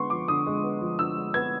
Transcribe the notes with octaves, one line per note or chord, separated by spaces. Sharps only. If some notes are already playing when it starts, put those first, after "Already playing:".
Already playing: D3 G#3 B3 C6 C#6
F3 D6
D3 D#6
G#3
B3
F3
D3 E6
G#3
B3 G#6